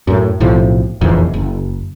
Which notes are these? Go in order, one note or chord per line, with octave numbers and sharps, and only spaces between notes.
F#2 A2
B1 A2 C3 F3
F1 A#1 E2 G#2
F#1